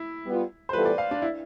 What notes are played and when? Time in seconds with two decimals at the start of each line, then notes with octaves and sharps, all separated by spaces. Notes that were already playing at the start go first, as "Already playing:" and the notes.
Already playing: E4
0.25 G3 B3 F4
0.69 C5
0.73 E3 G3 B3 F4 A4 B4
0.86 D5
0.98 F5
1.11 D4
1.22 E4